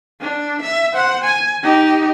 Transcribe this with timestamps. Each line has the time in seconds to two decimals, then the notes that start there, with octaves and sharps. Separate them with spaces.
0.21 D4
0.62 E5
0.93 C5 F#5
1.24 G#5
1.63 D#4 G4